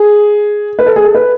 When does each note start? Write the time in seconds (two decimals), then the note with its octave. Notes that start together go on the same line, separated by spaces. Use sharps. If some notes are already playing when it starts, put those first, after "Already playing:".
Already playing: G#4
0.79 B4
0.86 A4
0.96 G#4
1.04 A4
1.15 B4